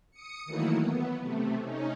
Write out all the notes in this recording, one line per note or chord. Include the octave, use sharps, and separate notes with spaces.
D#6 C#7
D#3 E3 F#3 A3 A#3 E4
B3
C3 A3
C#4 D#4